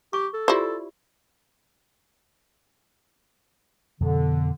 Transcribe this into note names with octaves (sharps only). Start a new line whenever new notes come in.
G4 C#6
A4
E4 F4 G4 C5 D5
F2 B2 D3 B3